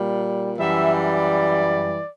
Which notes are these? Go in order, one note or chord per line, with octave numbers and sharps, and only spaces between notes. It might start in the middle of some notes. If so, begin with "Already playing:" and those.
Already playing: A#2 G3
F#2 E3 G3 E5
D5